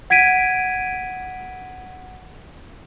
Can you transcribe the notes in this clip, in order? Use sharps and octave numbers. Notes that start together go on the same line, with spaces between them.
F#5 G#6 B6 D7 D#7